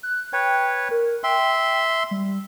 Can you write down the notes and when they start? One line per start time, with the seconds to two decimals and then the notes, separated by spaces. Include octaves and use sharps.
0.03 F#6
0.33 B4 C#5 G5
0.91 A#4
1.24 E5 G5 C6
2.11 G3